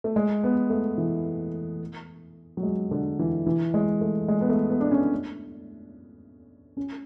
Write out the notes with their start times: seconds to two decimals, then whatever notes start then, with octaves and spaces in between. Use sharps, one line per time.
0.04 A3
0.16 G#3
0.44 B3
0.70 A3
0.98 E3
2.57 F#3
2.63 G#3
2.91 D3
3.19 E3
3.46 E3
3.74 G#3
4.01 A3
4.28 G#3
4.41 B3
4.49 A3
4.70 B3
4.80 D4
4.91 C#4
6.77 C#4